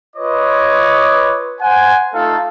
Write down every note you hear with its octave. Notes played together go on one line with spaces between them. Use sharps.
F4 B4 C#5 D#5 D6
C5 F#5 G#5
A3 D#4 F4 A4 F5